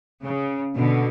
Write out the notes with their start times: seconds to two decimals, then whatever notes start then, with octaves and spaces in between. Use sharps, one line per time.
0.24 C#3
0.77 B2 D3